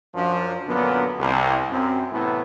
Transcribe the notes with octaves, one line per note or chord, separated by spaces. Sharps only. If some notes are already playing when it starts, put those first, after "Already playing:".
F#2 F3 D4
F#2 A#2 D3 F#3 B3
C2
F#2 C4
A2 C3 E3 A3 B3 E4